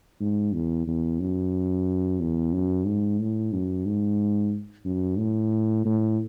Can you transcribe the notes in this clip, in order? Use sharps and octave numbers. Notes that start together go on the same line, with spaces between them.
G#2
E2
E2
F#2
E2
F#2
G#2
A2
F#2
G#2
F#2
A2
A2